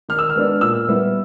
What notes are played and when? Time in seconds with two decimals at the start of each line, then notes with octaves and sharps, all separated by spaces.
0.09 D#3 F6
0.19 E6
0.29 F6
0.35 G#3 B3 D4
0.61 A#2 E6
0.89 G3 B3 E4